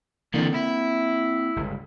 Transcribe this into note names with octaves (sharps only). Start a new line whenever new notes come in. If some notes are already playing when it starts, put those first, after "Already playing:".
E2 D3 A#3 C4
E4
G1 C#2